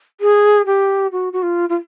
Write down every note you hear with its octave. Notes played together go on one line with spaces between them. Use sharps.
G#4
G4
F#4
F#4
F4
F4